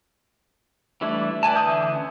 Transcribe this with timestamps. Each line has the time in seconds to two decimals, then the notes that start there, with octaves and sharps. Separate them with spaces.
1.01 E3 G3 A3 D4 E4
1.43 B4 D5 G#5 A5
1.56 D3 E3 E5 D#6 G6
1.94 C#4